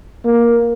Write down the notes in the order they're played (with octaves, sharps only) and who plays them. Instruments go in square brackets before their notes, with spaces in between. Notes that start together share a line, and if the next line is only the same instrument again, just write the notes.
[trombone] A#3